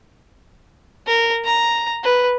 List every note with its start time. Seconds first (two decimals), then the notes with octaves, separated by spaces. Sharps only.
1.07 A#4
1.45 A#5
2.04 B4